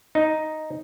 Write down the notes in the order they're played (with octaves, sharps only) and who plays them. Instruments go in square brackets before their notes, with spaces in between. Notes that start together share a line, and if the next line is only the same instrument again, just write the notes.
[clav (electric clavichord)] D#4